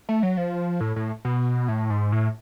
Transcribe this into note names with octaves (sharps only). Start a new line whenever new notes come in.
A3
F#3
F3
A2
A2
B2
A2
G#2
A2